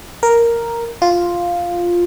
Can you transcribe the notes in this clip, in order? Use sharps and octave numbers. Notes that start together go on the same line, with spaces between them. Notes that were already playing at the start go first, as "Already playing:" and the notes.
A#4
F4